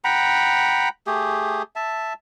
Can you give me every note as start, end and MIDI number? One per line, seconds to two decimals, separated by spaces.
0.04 0.89 78
0.04 0.89 79
0.04 0.89 82
0.04 0.89 83
1.07 1.62 57
1.07 1.62 67
1.07 1.62 68
1.76 2.13 76
1.76 2.13 81